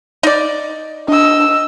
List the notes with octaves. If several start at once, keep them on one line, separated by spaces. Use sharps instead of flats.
D#4 D5
D4 D#5 E6